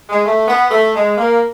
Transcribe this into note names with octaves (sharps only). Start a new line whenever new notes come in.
G#3
A3
B3
A3
G#3
A#3